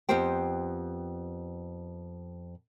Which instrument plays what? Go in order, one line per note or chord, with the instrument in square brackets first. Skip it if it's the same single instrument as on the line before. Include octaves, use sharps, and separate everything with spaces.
[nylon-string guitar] F2 B3 F4 G4 C5 G5